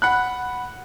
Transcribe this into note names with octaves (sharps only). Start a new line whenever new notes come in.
F#5 B5 F#6